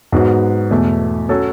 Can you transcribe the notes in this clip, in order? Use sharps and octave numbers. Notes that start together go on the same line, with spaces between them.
G#2 F#3 B3 F#4
E2 B2 A3
F#3 C#4 F#4 A4 C#5